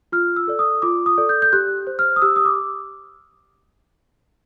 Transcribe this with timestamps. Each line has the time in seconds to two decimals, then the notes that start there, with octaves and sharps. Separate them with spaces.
0.12 F4 F6
0.36 E6
0.48 A4 D5
0.59 D#6
0.82 F4 D6
1.06 D#6
1.18 A4 D5
1.29 G6
1.42 G6
1.53 G4 F#6
1.87 C5
1.99 F6
2.16 D#6
2.22 G4 E6
2.36 D#6
2.45 D6